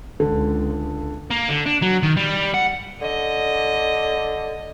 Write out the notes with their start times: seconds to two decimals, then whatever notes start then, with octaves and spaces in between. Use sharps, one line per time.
0.20 C#2 D3 A4
1.30 A#3
1.49 D3
1.66 D4
1.82 F#3
2.03 D#3
2.17 G3
2.54 F#5
3.01 D3 D#5